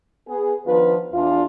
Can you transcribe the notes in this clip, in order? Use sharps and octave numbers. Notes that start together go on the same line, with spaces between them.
B3 G#4
D#3 F3 B3 D4 F4 B4
E2 D4 F4